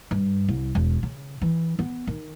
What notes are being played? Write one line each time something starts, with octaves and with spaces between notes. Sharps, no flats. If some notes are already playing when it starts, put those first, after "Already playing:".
G2
C2
E1
C#3
E3
B3
D#3